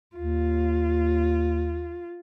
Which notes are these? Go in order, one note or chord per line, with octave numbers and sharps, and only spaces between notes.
D#2 F4